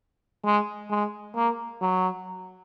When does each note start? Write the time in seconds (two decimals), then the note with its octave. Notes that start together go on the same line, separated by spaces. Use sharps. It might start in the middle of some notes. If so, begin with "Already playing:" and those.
0.45 G#3
0.90 G#3
1.35 A#3
1.81 F#3